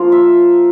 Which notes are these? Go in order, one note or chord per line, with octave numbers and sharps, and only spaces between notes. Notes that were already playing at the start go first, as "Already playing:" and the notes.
Already playing: F3 A#3 F4
E5